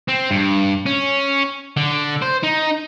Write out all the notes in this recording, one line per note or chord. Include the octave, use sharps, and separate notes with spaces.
C4
G2
C#4
D3
C5
D#4